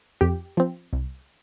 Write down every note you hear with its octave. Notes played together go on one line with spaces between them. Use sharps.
F2 G4
F3 C4
C2